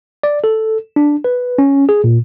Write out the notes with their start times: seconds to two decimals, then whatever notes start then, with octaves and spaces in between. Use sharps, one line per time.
0.23 D5
0.44 A4
0.96 D4
1.24 B4
1.58 C#4
1.89 G#4
2.04 A#2